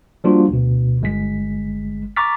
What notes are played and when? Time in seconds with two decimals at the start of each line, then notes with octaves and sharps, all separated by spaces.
0.24 F3 G3 A#3 D4 F4 F#4
0.49 D2 B2
1.01 G1 G#3 B6
2.16 A#5 C#6 D6 F6 A6 B6